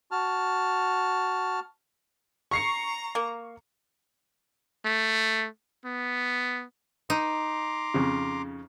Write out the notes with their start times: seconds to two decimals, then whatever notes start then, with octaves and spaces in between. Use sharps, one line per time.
0.11 F#4 A5 F6
2.51 A#5 C#6 C7 C#7
3.15 A#3
4.86 A3
5.85 B3
7.10 D#4 A#5 C6 D6
7.94 F2 C#3